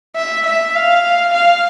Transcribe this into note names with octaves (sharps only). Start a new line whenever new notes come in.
E5
E5
F5
F5